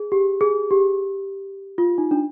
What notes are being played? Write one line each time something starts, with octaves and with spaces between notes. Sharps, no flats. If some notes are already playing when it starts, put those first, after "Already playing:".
Already playing: G#4
G4
G#4
G4
F4
D#4
D4